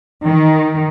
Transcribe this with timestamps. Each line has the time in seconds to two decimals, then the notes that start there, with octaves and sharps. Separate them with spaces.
0.24 D#3